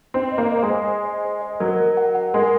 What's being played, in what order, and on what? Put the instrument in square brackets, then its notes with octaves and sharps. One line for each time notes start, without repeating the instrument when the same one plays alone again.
[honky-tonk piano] C4 [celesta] D#5
[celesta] D#5
[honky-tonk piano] A#3
[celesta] D#5
[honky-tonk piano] G#3
[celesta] C5
C5
D#5
C5
D#5
[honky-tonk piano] F#3 [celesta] A#4
[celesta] A#4
F#5
F#5
[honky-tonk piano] G#3 [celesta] A#4